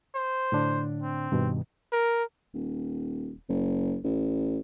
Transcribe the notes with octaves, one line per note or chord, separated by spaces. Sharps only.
C5
A2 D3 D4
C4
G2 B2 D#3
A#4
D#1
F#1
A1